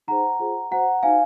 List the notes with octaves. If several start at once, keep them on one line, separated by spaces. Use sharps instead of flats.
D#4 G#4 C5 F#5 A#5
F4 G#4 C5
F#4 C5 F#5 A#5
D#4 F#4 C5 F5 G#5